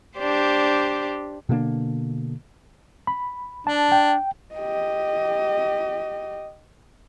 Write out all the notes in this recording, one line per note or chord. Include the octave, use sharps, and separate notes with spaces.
D4 G4 C5
B2 D3 A#3 D4
B5
D4 A5
G5
G4 D#5